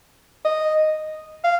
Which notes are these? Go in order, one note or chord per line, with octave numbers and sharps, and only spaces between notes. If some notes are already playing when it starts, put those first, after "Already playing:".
D#5
F5